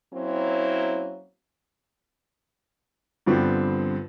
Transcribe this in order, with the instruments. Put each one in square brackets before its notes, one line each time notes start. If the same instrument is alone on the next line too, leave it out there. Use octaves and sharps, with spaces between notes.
[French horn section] F#3 A#3 C4 C#4 E4
[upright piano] G2 D3 F3 B3 C4